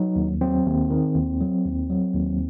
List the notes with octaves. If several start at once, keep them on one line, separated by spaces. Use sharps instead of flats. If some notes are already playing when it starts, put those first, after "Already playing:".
Already playing: F#3 D#4
D#2
F#3 C4
D#2
D#3
D#2
F#3
D#2
F#3
D#2